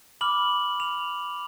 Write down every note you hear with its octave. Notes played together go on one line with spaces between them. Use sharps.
B5 D6 F6 F#7
F7